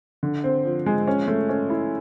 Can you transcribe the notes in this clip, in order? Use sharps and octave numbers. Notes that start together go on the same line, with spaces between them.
D3
C4
F3
G#3
C#4
A3
C#4
E4